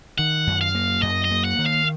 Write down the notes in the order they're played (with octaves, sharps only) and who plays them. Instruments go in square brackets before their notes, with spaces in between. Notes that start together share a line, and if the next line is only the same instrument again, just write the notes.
[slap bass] D#3 [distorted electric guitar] F#5
[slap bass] F#2
[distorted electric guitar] F5
[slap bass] A#3
[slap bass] F#2 [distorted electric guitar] D#5
[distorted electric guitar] D#5
[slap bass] A#3
[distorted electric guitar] F#5
[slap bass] D#3
[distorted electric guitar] F5